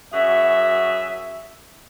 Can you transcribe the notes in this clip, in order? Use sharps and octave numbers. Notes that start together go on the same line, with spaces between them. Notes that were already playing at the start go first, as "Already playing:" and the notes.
F#2 F#4 G#4 E5